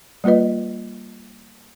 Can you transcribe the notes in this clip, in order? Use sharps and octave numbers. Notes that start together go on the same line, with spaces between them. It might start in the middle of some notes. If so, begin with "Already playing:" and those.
G3 A#3 F4 B4 D#5